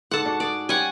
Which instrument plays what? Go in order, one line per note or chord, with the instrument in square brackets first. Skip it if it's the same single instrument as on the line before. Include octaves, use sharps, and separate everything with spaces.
[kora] G#2 A4 [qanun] F#5 A5
[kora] D4 F#4
[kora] G#4 [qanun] D5
[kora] G3 C#4 [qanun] F#5 G#5